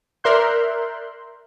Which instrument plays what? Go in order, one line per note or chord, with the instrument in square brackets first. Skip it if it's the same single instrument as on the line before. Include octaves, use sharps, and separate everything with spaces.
[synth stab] A#4 D5 E5 C6 F#6 G6